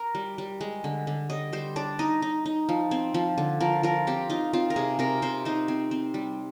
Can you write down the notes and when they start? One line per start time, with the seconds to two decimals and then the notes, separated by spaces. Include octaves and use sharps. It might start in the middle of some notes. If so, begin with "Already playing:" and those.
Already playing: A#4
0.15 G3
0.38 G3
0.61 G#3
0.84 D3
1.07 D3
1.30 G3 D#5
1.53 G3 C5
1.76 D4 D5
1.99 D#4 D#5
2.22 D#4
2.46 D#4
2.69 F3
2.91 C4
3.14 F3
3.38 D3
3.60 F3 A#4
3.83 F3 A#4
4.07 C4 G4
4.29 D#4 F4
4.53 C4 F4
4.70 A#4
4.76 C3 G#4
4.99 C3 A#4
5.22 C3 C5
5.45 D#4 C5
5.68 C4
5.91 C4
6.14 G3